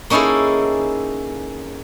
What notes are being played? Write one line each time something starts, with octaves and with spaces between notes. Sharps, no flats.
A#3 C#4 D#4 E4 G#4 A4